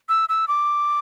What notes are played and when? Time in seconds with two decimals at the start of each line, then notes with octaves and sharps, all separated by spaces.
0.09 E6
0.29 E6
0.48 D6